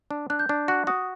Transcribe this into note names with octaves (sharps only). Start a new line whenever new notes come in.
D4
D4 F#6
G6
D4
F#4 F#6
F#4 D#6